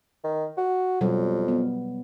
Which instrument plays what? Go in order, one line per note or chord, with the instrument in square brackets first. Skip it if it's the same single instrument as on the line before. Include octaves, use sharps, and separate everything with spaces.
[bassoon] D#3
F#4
[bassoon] F2 [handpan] B2 F#3 G3
[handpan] B3